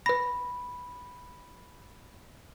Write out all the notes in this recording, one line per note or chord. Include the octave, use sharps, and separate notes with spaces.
B4 B5 A#6